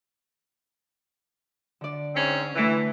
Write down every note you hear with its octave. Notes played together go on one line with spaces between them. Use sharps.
D3 D5
G#2 C4 C#4
D3 E3 A3